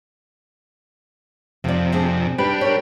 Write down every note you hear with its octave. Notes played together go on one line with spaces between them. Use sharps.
F2 C3 F4 D5
C4 D4 G#4
G3 D4 G4 B4
A#4 C#5